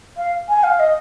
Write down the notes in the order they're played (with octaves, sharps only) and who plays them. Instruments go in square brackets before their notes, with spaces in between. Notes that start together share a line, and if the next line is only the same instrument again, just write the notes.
[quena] F5
G#5
F5
D#5